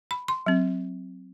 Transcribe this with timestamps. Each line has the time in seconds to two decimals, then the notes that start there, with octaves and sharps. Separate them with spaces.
0.11 B5
0.28 C6
0.46 F#3 C4